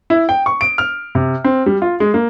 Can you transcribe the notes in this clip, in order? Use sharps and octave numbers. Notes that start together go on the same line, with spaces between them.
E4
G5
C#6
D7
F6
C3
C4
G3
F4
G#3
A#3